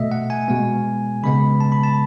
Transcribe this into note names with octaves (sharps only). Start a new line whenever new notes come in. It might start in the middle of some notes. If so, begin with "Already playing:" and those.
Already playing: B2 A3 D#5 E5
F#5
G#5
B2 G#3 B3
C#3 G#3 B3 B5
A5
B5
A5